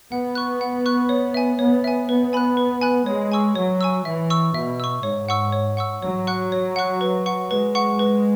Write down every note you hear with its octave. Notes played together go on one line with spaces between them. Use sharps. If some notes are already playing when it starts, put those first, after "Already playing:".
B3 F#5
C#6 F#6
F#5
C#6 F#6
C#5
E5 G#5
B3 C#5
E5 G#5
B3 B4
G#5 B5 F#6
B4
G#5 B5 F#6
G#3 C#5
G#5 C#6 E6
F#3 C#5
G#5 C#6 E6
E3 E5
C#6 E6
B2 E5
C#6 E6
G#2 C#5
F#5 C#6 E6
C#5
F#5 C#6 E6
F#3 C#5
F#5 C#6 F#6
C#5
F#5 C#6 F#6
B4
F#5 C#6
G#3 B4
F#5 C#6
B4